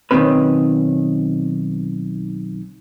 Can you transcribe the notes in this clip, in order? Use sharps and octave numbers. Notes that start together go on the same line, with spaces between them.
B1 D#3 F3 C4 C#4 B4